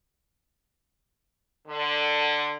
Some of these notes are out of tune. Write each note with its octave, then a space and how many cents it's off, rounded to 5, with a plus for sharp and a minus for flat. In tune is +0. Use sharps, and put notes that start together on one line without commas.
D3 +15